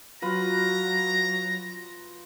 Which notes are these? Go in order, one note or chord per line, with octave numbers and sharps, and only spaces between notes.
F#3 F4 B4 A#5 B5